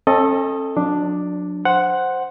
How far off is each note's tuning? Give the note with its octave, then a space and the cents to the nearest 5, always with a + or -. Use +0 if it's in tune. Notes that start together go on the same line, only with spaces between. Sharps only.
C#4 -45 A4 +5 D#5 +0
F#3 -40 D4 +0
C5 +0 F#5 +0